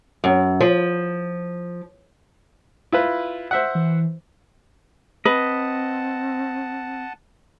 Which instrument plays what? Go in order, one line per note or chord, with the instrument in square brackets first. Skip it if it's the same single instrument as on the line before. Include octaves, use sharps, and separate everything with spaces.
[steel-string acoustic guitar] F#2
F3
[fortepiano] E4 F4 B4
C5 E5 F#5
[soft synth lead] E3
[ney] C4 [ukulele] B4 [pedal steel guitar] D#5 [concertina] F#5 A5